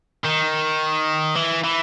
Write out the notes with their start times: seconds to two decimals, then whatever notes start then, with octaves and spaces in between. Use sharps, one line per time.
0.25 D#3
1.36 E3
1.64 E3